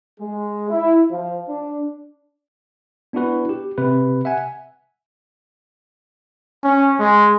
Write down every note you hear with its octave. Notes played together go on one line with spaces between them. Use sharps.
G#3
E4
F3
D4
B3 D4 E4 F#4 B4
G4
C3 B4
E5 F#5 G#5
C#4
G#3